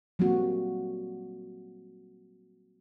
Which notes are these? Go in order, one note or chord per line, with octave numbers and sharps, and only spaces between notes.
F#3 G3 A#3 C4 F#4